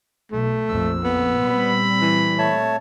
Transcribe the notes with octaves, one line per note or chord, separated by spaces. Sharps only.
B1 A3
A#1 F2 F3 E6
B3
A#2 G3 C4 B5
E3
A3 C#5 A5